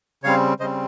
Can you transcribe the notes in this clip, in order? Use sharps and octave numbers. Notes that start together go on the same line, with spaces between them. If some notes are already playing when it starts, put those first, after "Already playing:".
C#3 G3 C4 C#5 F5
C#3 G3 C4 C5 D#5